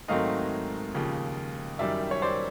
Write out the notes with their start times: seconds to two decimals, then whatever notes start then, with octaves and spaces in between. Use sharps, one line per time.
0.08 G#2 D#3 F#3 A3 C4 D#5 F5
0.95 D#2 C#3 F3
1.79 F#2 D#3 G3 D5 E5
2.11 C#5
2.22 C5 D5